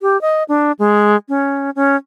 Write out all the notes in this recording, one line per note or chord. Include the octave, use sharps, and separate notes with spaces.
G4
D#5
D4
G#3
C#4
C#4